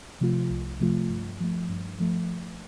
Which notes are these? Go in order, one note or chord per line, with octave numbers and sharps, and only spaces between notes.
C3 F3 A3 F4
C2
C3 F3 A3 F4
G2
F3 A3
G2
F3 A3